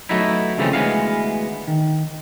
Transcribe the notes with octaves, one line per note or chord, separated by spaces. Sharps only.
F#3 A3 B3 D#4 E4
C#3 E3 F3 A3 C4 C#4
D2 A#2 E3 G#3 B3 F5
D#3